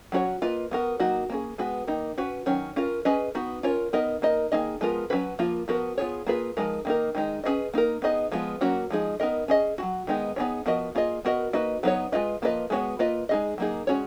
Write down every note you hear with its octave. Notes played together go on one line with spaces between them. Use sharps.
F#3 C#4 F#4 A#4 C#5
A#3 F4 B4 D#5
B3 F#4 A#4
F#3 A#3 D#4 F#4
A#3 C#4 G#4
G#3 B3 F#4 B4
D#3 A#3 D#4
C#4 F#4 B4
D#3 F#3 C#4
C#4 F4 A#4
C#4 G#4 B4 D#5
B3 D#4 F#4
C#4 F4 A#4 C#5
B3 D#4 A#4 D#5
A#3 D#4 A#4 D#5
D#3 A#3 D#4 G#4 D#5
F3 G#3 B3 F4 A#4
F#3 C#4 F#4 B4
F3 A#3 F4
F3 B3 F#4 A#4
B3 F4 G#4 C#5
A#3 F4 G#4 B4
F3 G#3 D#4 A#4
D#3 A#3 D#4 A#4
D#3 G#3 D#4
C#4 G#4 B4 D#5
A#3 D#4 A#4
B3 D#4 G#4 D#5
F3 G#3 B3 F4
F#3 A#3 C#4 F#4
F3 G#3 D#4 G#4
B3 D#4 A#4 D#5
C#4 G#4 D#5
F#3 C#4 F#4
D#3 G#3 B3 D#4
B3 D#4 G#4 C#5
F3 B3 F#4 A#4 D#5
A#3 F4 G#4 D#5
B3 F#4 A#4 D#5
A#3 D#4 F#4 B4 D#5
F#3 B3 D#4 A#4 C#5
G#3 C#4 F4 B4 D#5
F3 A#3 F4 B4 D#5
G#3 B3 F#4 C#5
A#3 F4 B4 D#5
G#3 D#4 G#4 D#5
F#3 A#3 D#4 G#4
G#3 C#4 F#4 C#5